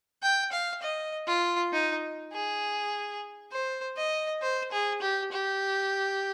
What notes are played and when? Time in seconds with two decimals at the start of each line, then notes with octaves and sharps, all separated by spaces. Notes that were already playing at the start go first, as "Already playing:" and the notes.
0.23 G5
0.52 F5
0.82 D#5
1.27 F4
1.72 D#4
2.32 G#4
3.52 C5
3.97 D#5
4.42 C5
4.72 G#4
5.01 G4
5.32 G4